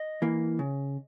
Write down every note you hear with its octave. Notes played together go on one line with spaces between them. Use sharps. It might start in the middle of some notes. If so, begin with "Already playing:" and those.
Already playing: D#5
E3 A#3
C#3